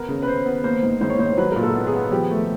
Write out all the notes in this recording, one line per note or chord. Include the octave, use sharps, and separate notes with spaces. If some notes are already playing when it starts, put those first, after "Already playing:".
Already playing: B3 A#4
C#3
B4
C#3 C5
B3
A#3 C5
G#2
G#2 C5
C#5
G#2 C5
F#3 B4
A#2 A#4
A4
B3
G#4
B3
F3 G4
A3